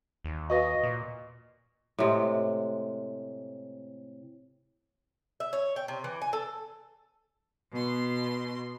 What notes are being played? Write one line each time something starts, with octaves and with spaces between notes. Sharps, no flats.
D#2
F#4 B4 D#5 F5 C#6 A#6
A#2
A2 C3 G#3
E5
C#5
G5
C3
E3
G#5
A4
B2 C6